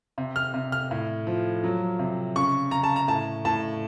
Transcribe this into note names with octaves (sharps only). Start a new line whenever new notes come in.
C3
F6
C3
F6
A2
F3
F#3
C3
C#3 C#6
C#3 A#5
A5
A#5
A2 A5
A2 A5